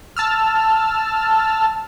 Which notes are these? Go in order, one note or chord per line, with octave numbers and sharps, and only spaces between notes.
A5 E6 F6